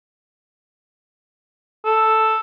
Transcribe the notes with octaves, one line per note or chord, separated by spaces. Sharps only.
A4